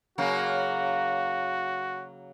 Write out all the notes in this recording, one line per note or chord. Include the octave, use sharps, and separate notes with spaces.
C#3 F#3 A#3 F#4